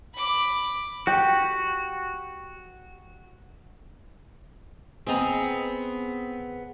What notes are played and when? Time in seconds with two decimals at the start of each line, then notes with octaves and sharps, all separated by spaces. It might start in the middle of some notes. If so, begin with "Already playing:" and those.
0.14 B5 D6
1.07 F#4 G4
5.07 B3 C4 G#4 D#5 A#5